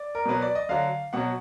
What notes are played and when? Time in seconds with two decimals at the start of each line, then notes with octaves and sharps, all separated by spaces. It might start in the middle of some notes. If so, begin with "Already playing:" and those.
Already playing: D5
0.15 A#4
0.25 B2 F#3 B4
0.42 D5
0.55 D#5
0.69 D3 F#3 F5
1.13 B2 F#3 F#5